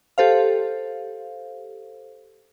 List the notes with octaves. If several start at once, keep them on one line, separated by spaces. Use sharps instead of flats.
G4 A4 C5 F5